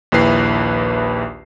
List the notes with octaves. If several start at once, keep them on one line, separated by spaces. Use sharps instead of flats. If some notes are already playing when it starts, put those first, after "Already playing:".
A#1 D#2 E4 B4 C7